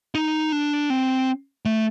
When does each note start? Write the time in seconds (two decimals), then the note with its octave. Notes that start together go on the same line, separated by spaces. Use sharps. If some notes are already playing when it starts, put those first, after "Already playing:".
0.15 D#4
0.52 D4
0.90 C4
1.65 A3